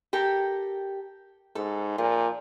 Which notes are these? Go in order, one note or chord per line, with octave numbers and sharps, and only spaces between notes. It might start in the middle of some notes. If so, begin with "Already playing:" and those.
G4 A4 A#4
G#2 A4
A#2 F3